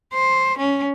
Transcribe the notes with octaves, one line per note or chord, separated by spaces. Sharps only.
C5
C#4